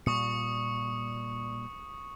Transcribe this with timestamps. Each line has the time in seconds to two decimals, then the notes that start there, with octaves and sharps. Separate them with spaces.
0.06 A#2 G3 C#6 D#6 C#7